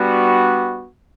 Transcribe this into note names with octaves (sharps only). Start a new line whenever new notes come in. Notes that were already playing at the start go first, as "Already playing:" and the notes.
Already playing: G3 B3 D4 F#4